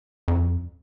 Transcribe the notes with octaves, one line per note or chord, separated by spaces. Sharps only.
F2